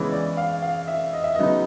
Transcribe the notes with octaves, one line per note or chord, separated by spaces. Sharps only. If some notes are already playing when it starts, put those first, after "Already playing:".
Already playing: C#3 E3 G#3 B3 C#5
D5
F5
F5
E5
D#5
E5
C#3 F#3 B3 D#4 D#5